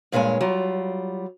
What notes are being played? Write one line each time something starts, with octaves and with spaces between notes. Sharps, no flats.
G2 A#2 G#3 C#5 G#5
F#3 G3 F4